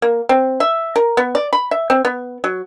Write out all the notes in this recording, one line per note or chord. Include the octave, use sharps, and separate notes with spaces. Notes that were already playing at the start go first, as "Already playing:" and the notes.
A#3
C4
E5
A#4
B3
D5
B5
E5
C4
B3
F#3